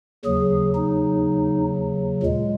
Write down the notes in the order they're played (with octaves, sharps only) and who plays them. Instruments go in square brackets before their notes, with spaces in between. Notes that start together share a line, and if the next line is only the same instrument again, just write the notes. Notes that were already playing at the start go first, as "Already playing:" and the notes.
[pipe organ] D#2 C#3 F#3 G#4
D#4
A#2 G#3